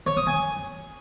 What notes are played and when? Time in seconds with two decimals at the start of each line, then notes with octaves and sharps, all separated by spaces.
0.07 C#5
0.17 D#6
0.27 G#5